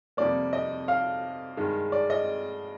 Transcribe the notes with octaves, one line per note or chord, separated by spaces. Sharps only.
F2 C3 G3 A#3 D5
D#5
F5
G2 D#3 G#3
D5
D#5